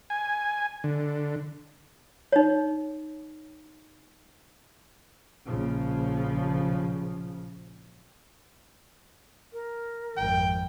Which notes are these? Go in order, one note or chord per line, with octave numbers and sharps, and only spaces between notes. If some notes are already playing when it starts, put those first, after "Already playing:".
G#5
D3
D#4 C#5
A#1 C#3 F3
A#4
G#1 F2 G5